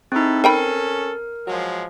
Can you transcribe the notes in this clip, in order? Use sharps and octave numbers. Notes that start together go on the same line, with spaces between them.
C4 D#4 E4 G#4 A4
C4 C#4 A4 A#4 G5 B5
F3 F#3 G#3